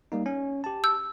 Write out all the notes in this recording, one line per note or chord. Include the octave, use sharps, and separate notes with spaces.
G3 A#3 D#4
C#4
G4 A5
E6 G6